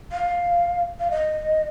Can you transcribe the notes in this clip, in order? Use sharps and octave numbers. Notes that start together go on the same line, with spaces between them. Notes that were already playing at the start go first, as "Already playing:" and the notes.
F5
F5
D#5